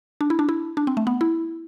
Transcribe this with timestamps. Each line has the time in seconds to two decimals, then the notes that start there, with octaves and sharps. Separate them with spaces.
0.21 D4
0.30 E4
0.39 D4
0.49 E4
0.77 D4
0.87 C4
0.97 A3
1.07 B3
1.21 E4